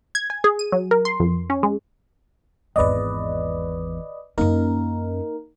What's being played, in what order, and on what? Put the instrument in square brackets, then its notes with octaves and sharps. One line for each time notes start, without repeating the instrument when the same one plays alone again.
[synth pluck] G#6
G#5
G#4
D#7
F#3
A#4
C6
F2
C#4
G#3
[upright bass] G#1 E2 [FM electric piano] B4 D5 D#5
[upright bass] F#2 C#4 [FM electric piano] A#3 D#4 A#4